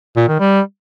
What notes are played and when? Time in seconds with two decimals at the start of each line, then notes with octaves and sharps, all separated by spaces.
0.17 A#2
0.28 D#3
0.40 G3